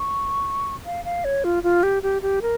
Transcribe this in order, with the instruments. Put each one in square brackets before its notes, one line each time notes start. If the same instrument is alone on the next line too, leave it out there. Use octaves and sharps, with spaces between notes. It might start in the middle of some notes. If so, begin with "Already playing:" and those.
Already playing: [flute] C#6
F5
F5
C#5
F4
F4
G4
G4
G4
A#4